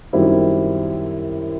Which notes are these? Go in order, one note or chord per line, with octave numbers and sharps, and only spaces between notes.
F#2 D#3 G3 C4 E4